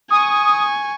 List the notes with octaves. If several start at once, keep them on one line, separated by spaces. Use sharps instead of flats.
G#5 C#6 D#6